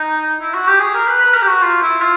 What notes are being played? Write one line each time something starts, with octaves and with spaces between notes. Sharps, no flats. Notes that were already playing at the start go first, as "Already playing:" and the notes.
Already playing: D#4
E4
F#4
G4
G#4
A#4
B4
B4
A#4
G4
F#4
F4
E4
F4